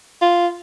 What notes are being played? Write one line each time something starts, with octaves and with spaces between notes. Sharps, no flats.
F4